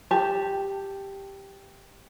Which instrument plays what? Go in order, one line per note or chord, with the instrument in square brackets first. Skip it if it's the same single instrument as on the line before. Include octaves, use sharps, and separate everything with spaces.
[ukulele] G4 A5